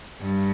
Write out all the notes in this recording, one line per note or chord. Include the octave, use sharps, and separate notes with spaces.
G2